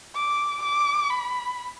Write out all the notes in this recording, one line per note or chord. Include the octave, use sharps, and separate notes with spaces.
D6
D6
B5